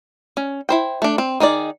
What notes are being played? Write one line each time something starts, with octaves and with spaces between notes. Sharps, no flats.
C#4
E4 C5 G5
A3 D4
C4
D#3 D#4 G#4 D5